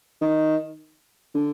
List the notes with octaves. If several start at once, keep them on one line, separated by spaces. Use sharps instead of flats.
D#3
D3